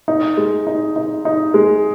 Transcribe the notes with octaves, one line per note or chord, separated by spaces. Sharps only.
D#4
G#3
D#4
D#4
D#4
G#3